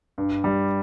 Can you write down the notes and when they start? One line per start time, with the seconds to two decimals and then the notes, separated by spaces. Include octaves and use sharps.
0.18 G2
0.44 G3